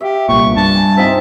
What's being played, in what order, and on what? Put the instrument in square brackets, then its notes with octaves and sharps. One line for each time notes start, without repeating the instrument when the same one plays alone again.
[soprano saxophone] G4 [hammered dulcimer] E5 F5
[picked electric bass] C2 A#2 [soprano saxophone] C#6
[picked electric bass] G2 [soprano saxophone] A5
[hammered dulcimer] G#5
[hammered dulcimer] C3 F3 D#4 [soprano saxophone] E5